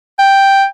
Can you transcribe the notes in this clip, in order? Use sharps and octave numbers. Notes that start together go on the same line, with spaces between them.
G5